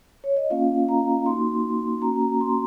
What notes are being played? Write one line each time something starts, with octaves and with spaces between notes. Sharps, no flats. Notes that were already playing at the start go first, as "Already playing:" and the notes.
C#5
D#5
A#3 C#4 F4 F5
A#5
A#3 D#4 F#4 C6
A#3 C#4 F#4 A#5
A#5
C6